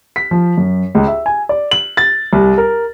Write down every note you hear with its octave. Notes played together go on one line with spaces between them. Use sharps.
B6
F3
F#2
C#2
E5
G#5
D5
F#7
A6
C2
A#4